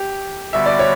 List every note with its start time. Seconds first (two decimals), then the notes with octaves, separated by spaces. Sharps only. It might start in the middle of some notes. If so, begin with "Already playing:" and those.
Already playing: G4
0.52 D3 G3 B3 F#4 E5
0.66 D5
0.79 C#5